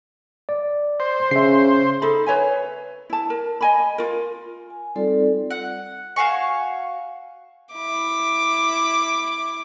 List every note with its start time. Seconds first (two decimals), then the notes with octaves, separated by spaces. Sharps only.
0.49 D5
1.00 C5
1.31 C#3 E5 C7
2.02 D#4 A4 E5 B5
2.26 B4 C#5 E5 G#5
3.10 E4 A5
3.30 A#4
3.61 D#5 G#5 B5
3.98 F4 A#4
4.70 G#5
4.96 G3 C4 D#4 F4 A4 D5
5.50 F#5
6.16 F#4 F5 G#5 C#6
7.73 E4 D6